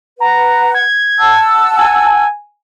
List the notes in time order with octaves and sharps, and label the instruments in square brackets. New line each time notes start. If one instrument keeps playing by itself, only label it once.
[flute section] B4 F#5 [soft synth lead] A#5
[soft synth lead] G#6
[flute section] F#5 A5 E6
[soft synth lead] G#5